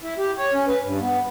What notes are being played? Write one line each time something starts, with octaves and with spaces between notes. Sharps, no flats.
E4
G4
C#5
C#4
B4
G2
B3